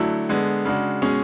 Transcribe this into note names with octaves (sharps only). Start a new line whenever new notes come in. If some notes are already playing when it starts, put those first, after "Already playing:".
Already playing: D3 F#3 A3 E4
D3 G#3 B3
C#3 G#3 D4 F#4
B2 G#3 C#4 G#4